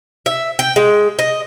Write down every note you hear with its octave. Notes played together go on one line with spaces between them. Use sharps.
E5
G5
G#3
D#5